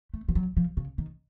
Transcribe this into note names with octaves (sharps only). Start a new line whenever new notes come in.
A3
F3
F#3
F3
C#3
D#3